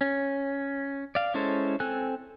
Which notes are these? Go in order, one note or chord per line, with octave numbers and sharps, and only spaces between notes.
C#4
D5 F5
G#3 C#4 E4 A4 C5
C4 A4 G#5 F#6